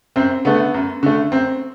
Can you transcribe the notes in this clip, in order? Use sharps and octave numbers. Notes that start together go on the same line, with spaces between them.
F#2 C4
D3 A3 B3
F#2
D3 A3
F#2 C4